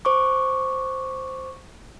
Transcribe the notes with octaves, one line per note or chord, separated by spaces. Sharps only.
C5 C#6 D6